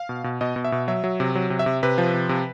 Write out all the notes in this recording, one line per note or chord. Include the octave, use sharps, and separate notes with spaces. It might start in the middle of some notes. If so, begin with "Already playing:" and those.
Already playing: F5
B2
B2
B2 D#5
B2
E5
B2
F#3 E5
F#3
C3
F#3
C3
E5
C3
C3 B4
F3
C3
C3